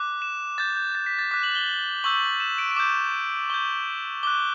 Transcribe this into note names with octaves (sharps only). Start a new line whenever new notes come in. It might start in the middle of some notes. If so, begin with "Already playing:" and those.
Already playing: D6 F#6
E7
D6 G6 A6
G6
A6
B6
A6
D6 F#6 B6
F#7
G7
C#6 E6 G6 F#7
E7
D7
D7
D6 G6 E7
C#6 G6 G7
D6 F#6 G7